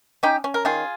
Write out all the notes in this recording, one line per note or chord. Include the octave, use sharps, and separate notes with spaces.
C#4 D#4 G4
C#4
A#4
D#3 F4 G#4